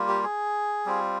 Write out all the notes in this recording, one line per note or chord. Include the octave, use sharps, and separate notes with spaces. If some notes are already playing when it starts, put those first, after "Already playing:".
Already playing: G3 A#3 F4
G4
G#4
G3 C4 F4